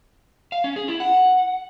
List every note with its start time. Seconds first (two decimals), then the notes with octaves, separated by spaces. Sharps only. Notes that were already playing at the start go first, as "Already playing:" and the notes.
0.52 F5
0.64 C#4
0.76 G#4
0.88 E4
1.00 F#5